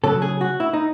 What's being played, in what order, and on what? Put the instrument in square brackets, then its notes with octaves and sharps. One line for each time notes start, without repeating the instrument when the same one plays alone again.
[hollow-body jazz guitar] C#3 F#3 A4
G#4
F#4
E4
D#4